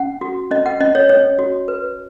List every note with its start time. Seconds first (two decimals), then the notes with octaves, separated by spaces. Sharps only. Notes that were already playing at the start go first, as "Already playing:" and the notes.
Already playing: C#4 F#5
0.21 F#4
0.51 C#4 D#5
0.66 F#5
0.80 C#4 D#5
0.95 C#5
1.09 C#4 C#5
1.39 F#4
1.68 B4